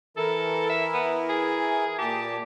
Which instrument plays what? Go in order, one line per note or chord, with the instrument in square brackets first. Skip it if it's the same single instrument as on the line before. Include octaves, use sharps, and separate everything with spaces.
[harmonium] E3 E4 A#4 [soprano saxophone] A4
[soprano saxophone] E5
B3
G#4
[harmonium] A#2 A5 [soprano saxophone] G4